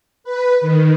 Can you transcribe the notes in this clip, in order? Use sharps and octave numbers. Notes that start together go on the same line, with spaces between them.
B4
D#3